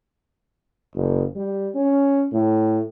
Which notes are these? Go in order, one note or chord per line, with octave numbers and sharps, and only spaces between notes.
F#1
G3
C#4
A2